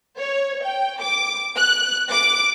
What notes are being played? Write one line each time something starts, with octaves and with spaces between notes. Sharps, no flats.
C#5
G5
D6
F#6
D6